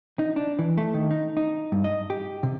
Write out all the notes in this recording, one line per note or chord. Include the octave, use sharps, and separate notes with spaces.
D#4
D4
E3
A3
D#3
D#4
D#4
G2
D#5
G4
C3